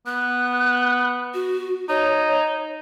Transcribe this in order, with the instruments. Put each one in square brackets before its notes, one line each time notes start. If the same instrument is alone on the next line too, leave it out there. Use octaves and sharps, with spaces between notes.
[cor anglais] B3 [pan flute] F#6
[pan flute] F#4
[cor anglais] D#4 [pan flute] C#5